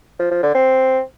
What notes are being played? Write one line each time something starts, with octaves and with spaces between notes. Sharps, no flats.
F3
F3
D3
C4